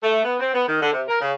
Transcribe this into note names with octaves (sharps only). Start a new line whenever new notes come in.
A3
B3
C4
B3
D#3
D3
C3
A#4
C#3